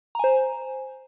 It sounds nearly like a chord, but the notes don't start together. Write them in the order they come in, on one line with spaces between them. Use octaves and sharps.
A#5 G#5 C5